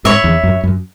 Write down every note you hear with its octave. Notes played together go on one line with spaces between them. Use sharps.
G#2 C#5 E5 B5
E2
F#2
F#2